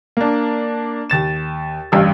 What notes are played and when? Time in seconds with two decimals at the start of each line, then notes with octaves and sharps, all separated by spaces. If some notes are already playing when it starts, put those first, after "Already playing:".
0.17 A#3 D4
1.10 D#2 A6 E7
1.92 A1 G2 G3 F5 E6